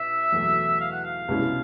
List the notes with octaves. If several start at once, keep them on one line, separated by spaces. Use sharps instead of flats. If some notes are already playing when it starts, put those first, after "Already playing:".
Already playing: B2 D#4 E5
E2 B2 F#3 A3
F5
F#5
F5
C2 B2 G#3 C#4 E4